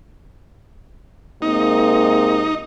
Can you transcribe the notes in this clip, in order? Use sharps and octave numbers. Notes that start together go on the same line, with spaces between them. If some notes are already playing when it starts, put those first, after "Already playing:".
C3 G#3 A#3 D#4